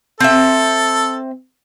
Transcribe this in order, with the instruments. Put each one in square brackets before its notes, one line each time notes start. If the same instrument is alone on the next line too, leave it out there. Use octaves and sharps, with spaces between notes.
[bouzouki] C4 E5 [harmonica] A4